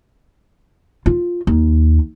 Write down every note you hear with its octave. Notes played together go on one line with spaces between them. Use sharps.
F4
D#2